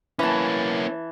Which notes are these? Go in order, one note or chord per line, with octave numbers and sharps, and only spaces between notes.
E3 A#3 C#4 A5